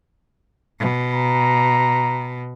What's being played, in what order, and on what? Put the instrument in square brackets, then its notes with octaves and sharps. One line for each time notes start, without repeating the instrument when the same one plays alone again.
[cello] B2
[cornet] A#5